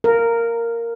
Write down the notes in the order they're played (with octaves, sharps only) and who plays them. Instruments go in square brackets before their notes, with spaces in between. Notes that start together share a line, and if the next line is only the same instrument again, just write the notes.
[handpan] A#4